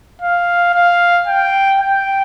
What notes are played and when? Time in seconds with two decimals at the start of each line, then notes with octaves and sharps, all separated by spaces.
0.22 F5
0.74 F5
1.27 G5
1.80 G5